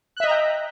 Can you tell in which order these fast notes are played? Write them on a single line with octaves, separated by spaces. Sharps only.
F#6 E5 D#5 A#5 G5